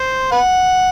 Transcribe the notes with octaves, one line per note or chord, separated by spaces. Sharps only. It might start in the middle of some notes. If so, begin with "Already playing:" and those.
Already playing: C5
B4 F#5